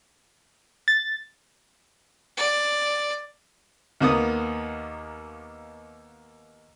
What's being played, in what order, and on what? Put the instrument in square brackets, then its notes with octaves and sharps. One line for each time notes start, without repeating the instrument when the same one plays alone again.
[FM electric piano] A6
[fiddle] D5
[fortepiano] D#2 A#3 B3 D#6